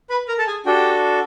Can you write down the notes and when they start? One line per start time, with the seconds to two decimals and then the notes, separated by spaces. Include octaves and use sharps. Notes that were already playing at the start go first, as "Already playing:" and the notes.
0.10 B4 B5
0.28 A#4 A#5
0.39 A4 A5
0.47 G#4 G#5
0.66 D4 F#4 G4 A4 G5